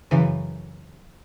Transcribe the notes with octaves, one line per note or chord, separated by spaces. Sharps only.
F#2 C#3 E3